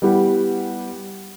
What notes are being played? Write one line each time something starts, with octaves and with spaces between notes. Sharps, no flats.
G3 B3 E4 G4 F#5